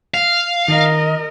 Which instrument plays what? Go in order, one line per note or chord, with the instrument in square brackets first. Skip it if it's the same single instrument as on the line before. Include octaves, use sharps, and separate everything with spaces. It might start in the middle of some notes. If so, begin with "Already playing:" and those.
[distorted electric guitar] F5
[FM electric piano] D#3 [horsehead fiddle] A#4 D#5